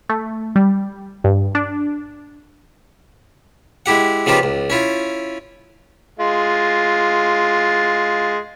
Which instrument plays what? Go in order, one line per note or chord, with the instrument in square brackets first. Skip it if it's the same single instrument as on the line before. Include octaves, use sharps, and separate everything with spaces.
[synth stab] A3
G3
G2
D4
[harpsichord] G#3 E4 G4 F#5
C#3 F3 B3 D#4 F4 G4
C#2
C#4 E4 F4
[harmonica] G#3 F4